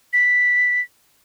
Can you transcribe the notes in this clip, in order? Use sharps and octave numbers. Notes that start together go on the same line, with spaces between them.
B6